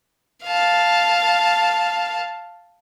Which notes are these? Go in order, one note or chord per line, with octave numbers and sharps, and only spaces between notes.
F5 A5